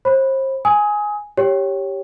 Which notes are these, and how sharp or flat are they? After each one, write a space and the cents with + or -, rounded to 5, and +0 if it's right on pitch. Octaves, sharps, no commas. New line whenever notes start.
C5 +35 B5 +0
G#5 +0 D#6 +30
G4 +0 C#5 +0 G5 +0